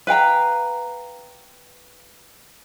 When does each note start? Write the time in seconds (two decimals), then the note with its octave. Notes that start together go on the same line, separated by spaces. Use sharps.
0.07 B4 F5 G5 A#5